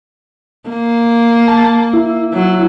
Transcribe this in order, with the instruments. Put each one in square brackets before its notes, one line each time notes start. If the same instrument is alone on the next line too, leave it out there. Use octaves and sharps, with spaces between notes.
[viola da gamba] A#3
[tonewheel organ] A5
E4
[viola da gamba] F#3